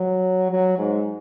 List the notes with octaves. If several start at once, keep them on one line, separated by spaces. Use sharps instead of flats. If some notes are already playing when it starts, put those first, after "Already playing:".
Already playing: F#3
F#3
G#2